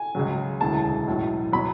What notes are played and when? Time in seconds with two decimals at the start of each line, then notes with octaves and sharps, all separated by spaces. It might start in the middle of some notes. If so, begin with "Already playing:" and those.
Already playing: G#5
0.15 C#2 C#3 F#3
0.60 E1 D2 C#3 E3 A5
1.07 B1 A2 F#3
1.52 B2 F#3 B5